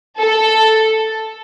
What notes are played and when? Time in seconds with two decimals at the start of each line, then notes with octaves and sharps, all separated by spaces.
0.19 A4